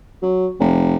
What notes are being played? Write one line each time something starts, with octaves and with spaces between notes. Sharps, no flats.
F#3
F1